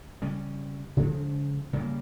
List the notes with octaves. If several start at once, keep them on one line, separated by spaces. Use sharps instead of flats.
C#3 G3 C#4
C#3 F3 G#3 C4
C#3 G3 A#3